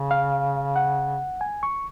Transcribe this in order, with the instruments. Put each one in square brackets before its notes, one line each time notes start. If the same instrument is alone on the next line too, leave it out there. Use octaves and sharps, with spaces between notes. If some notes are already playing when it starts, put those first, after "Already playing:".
Already playing: [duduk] C#3
[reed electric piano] F5
F#5
G#5
C#6